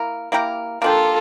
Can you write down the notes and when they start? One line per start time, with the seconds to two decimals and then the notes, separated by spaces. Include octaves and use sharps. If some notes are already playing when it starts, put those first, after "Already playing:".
Already playing: A#3 E4 A#4
0.32 A#3 E4 G4 A#4
0.82 A#3 D4 F4 G4 A4